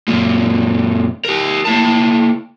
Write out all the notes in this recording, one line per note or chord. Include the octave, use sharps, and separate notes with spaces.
F#2 A#2
G4 A#4
A#3 E4 A5